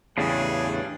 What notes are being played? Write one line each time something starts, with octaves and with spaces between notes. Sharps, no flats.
E2 A2 C#3 D4 G4 G#4